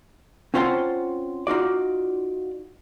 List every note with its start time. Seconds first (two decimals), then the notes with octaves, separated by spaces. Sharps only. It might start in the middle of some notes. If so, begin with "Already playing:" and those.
0.54 C4 C#4 F4 C5 F#5 A5
1.47 D#4 F4 F#4 D5